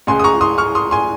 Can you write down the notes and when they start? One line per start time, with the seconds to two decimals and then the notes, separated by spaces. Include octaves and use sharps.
0.07 C#2 C#3 G#3 G#5 C6
0.19 D#6
0.24 A#5 C#6
0.41 C6 D#6
0.58 C#6 F6
0.75 C6 D#6
0.91 G#5 C6